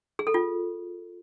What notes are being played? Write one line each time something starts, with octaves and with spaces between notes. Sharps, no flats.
G#4
A4
F4